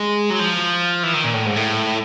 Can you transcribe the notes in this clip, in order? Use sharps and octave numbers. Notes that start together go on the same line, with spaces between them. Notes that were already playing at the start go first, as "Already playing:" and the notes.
Already playing: G#3
F#3
F3
E3
D#3
A#2
A2
G#2
A2